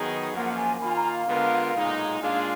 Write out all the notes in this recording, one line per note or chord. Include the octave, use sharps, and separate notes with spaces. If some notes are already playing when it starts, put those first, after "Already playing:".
Already playing: D#3 F#3 B3 D#4 G#4
F#2 F3 A#3 F4 F#5
G#5
D#3 A#3 F4 B5
G#5
A#5
F5
D3 G#3 B3 F4 A#4
B1 A#2 G#3 D#4 G#4
A#2 G#3 D4 F4 G#4 F5